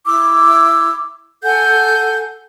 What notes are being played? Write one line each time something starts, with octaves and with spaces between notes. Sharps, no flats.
E4 D6 E6
A4 F#5 G#5 G6